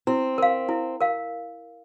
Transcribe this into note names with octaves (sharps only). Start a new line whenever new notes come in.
C4 E4
A#4 F5
E4
A#4 F5